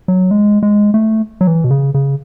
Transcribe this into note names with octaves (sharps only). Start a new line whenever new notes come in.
F#3
G#3
G#3
A3
F#3
E3
B2
C#3
C#3